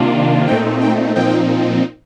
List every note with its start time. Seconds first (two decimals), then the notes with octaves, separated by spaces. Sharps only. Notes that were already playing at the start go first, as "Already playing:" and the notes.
Already playing: C3 D#3 A#3 D4 F4
0.48 A#2 A3 C4 D#4 G5
0.82 G5
1.16 A#2 F3 C4 D#4 G5